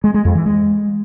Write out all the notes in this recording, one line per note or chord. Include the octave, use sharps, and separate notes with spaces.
G#3
G#3
F2
E3
G#3